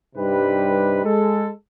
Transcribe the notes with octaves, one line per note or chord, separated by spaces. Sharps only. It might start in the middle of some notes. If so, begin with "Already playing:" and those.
G2 C3 G3 D#4 G4 B4
G#3 A4